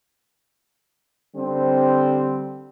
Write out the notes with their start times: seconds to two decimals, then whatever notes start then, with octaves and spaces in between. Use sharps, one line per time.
1.35 D3 G3 C4